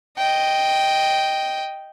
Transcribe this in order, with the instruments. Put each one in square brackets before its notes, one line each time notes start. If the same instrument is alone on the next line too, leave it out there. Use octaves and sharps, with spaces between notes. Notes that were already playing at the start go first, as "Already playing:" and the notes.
[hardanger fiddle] D#5 G5